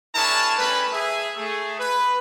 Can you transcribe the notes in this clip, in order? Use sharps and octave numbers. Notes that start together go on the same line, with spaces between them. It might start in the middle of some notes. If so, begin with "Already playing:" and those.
D4 E4 G#4 A#4 C#5 A5
G3 A3 C#4 A#4 B4
G#4 E5
A3 G#4
B4